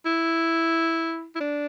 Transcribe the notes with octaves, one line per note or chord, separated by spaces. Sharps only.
E4
E4
D4